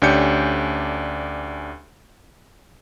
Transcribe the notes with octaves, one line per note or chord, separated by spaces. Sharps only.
D2 C#4 D4 G4 G6 C#7